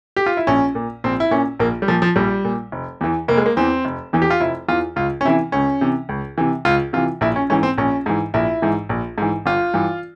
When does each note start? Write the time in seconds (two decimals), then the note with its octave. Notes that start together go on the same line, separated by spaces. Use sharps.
0.17 G4
0.26 F4
0.37 E4
0.47 A#1 C#4
0.75 A#2
1.04 A#1 C4
1.20 E4
1.31 A#2 C#4
1.60 A#1 A#3
1.82 G3
1.88 A#2 F3
2.02 F3
2.16 A#1 G3
2.45 A#2
2.72 F1
3.01 E2 E3
3.28 F1 A#3
3.37 G#3
3.46 A#3
3.57 E2 E3 C4
3.85 F1
4.13 E2 E3
4.22 G4
4.30 F4
4.40 F1 E4
4.69 E2 E3 F4
4.96 C#2 F4
5.21 C#4
5.25 C3 E3 E4
5.52 C#2 C#4
5.81 C3 E3
6.09 C#2
6.38 C3 E3
6.65 C#2 F4
6.93 C3 E3 F4
7.21 A#1 E4
7.36 C#4
7.50 G#2 E3 C#4
7.63 C4
7.78 A#1 C#4
8.06 G#2 E3
8.34 A#1 E4
8.62 G#2 E3
8.89 A#1
9.18 G#2 E3
9.46 G1 F4
9.74 G2 E3